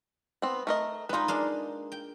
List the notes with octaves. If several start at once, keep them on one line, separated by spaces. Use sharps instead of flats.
B3 C4
A3 A#4 D#5
G#3 D#4 F4 B4
G#3 A#3 D4
G5